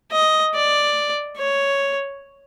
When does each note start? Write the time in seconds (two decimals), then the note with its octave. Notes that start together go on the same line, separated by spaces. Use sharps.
0.13 D#5
0.55 D5
1.37 C#5